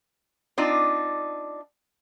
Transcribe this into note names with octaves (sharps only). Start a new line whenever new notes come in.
C4 D4 D#4 F4 D5